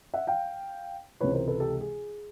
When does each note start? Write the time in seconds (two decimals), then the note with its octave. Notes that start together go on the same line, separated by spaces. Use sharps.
0.14 E5 F#5
0.27 F5 G5
1.20 C#2 C3 E3 B4 C#5
1.33 A#4 C5
1.48 A4 B4
1.60 G4 A4
1.81 G#4